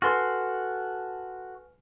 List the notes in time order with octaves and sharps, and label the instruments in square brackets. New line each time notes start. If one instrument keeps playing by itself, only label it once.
[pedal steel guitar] F#4 A4 C6 [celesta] B4 G#5 F6